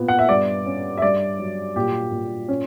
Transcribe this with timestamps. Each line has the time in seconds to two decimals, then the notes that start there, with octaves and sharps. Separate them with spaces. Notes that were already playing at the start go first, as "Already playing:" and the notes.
Already playing: A#2 B3
0.08 F#5
0.19 E5
0.29 G2 D5
0.66 C#4
0.98 E5
1.02 G2 D5
1.39 F#3
1.76 A#2 G4
2.12 A#2
2.48 C#4